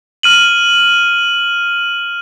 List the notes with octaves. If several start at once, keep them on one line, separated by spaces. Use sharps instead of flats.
F6 D#7 F#7